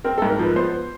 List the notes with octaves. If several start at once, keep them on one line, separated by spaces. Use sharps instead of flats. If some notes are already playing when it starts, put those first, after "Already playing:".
C4 A#4
G#2 A4
A#4
F3 B4
B3 C5